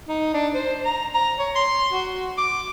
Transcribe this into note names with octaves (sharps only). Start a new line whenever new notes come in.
D#4
D4
C5
A#5
A#5
C#5
C6
F#4
D6